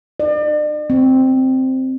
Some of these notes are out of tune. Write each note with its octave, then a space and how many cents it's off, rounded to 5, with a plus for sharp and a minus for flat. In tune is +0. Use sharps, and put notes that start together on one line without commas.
D5 +40
C4 +0